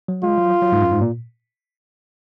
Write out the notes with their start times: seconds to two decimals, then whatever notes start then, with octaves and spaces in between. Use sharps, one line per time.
0.08 F#3
0.23 G#3 F4
0.38 F#3
0.62 F#3
0.72 G#2
0.82 F#2
0.91 G#2
1.01 A#2